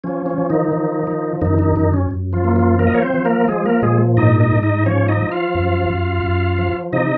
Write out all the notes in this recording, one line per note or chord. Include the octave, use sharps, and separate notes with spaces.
F3 C#4
C#4
F3
D#3 D#4
F3
F3
F#2 D#3 D#4
D#3 D#4
F#2 D#3 D#4
C#4
F#2
F3 F4
A#3
F3 F4
F3 A#3 A#4
D#5
C#5
C4 C5
F3
A#3 A#4
F3 G#3 G#4
A#3 A#4
A#2 G#3 G#4
G#2 D#4 D#5
D#4 D#5
G#2
D#4 D#5
F3 C#4 C#5
D#4 D#5
F3
F4 F5
F#2
F#2
F#2
F3
C3 D#4 D#5